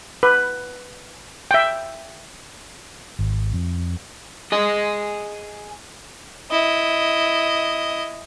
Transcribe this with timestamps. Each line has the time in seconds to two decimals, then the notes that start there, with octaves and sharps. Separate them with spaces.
0.23 B4
1.51 E5 G5
3.19 G#1
3.53 F2
4.52 G#4 D#5
6.51 E4 D#5